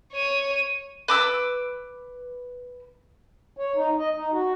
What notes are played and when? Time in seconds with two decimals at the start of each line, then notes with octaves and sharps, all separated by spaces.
0.13 C#5 D#7
1.08 B4 D6 E6
3.57 C#5
3.75 D#4
3.98 D#5
4.14 D#4
4.32 F#4